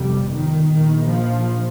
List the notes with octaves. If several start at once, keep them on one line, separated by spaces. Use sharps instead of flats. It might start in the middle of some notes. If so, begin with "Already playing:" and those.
Already playing: G1 F2 C3 G3
D#3
A#1 A#2 D#3
F3